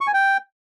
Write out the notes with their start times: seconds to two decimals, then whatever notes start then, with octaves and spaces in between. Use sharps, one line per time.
0.01 C#6
0.07 G#5
0.14 G5